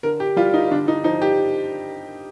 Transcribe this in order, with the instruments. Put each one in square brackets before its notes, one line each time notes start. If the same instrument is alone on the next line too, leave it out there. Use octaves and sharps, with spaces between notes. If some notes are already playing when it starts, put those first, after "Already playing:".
[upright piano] D3 A#4
G4
G3 F4
D#4
D3 D4
D#4
F3 D#4
G4